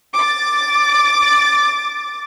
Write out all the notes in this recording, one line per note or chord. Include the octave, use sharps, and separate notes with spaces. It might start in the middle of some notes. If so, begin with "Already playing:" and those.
D6 A6